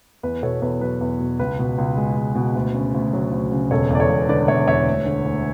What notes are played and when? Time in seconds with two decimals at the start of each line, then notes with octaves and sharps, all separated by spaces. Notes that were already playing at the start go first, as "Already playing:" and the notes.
0.23 E2 B4
0.43 B2 A4 C#5
0.62 E2 B4
0.81 F#3 B4
1.01 E2
1.20 B2
1.39 C#2 B4
1.59 B2
1.78 C#2
1.97 G#3
2.16 C#2
2.35 B2
2.55 D2
2.75 C#3
2.94 D2
3.13 F#3
3.32 D2
3.52 C#3
3.71 E1 A4 C#5
3.90 E2 D5
4.00 A4 C#5
4.10 E1
4.29 D3 B4 D5
4.48 E1 C#5 E5
4.68 E2 C#5 E5
4.87 D2
5.06 D3
5.25 D2